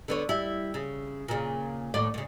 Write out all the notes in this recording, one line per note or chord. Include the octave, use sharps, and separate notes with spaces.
D3 B3 C#5
G3 E4
C#3
A#2 C#3
D#2 A2 D5
A2 C#3